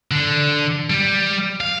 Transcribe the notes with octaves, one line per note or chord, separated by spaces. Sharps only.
D3
G3
F5